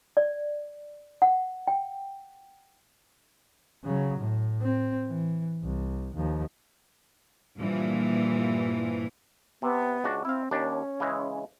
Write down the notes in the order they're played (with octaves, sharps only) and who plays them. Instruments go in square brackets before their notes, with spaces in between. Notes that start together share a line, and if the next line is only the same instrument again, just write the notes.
[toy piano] D5
F#5
G5
[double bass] C#3 F#3
A2
C4
E3
C2
D#2 F3
[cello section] G2 A#2 E3 F3
[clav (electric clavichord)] C3 [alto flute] B3
[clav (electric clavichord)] C#2 D4 F#4
[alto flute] C4 [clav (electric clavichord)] E4 F5
[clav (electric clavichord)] D#2 D4 [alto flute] C#4
[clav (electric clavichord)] C#3 E3 G#3